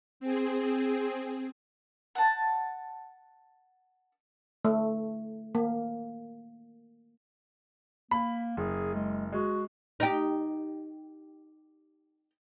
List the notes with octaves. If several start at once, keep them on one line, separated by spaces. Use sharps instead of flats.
C4 G#4
F#5 A5
A3
A#3
A#3 B5
F#1 G#4
G#3
G#3 F#4
D#4 G4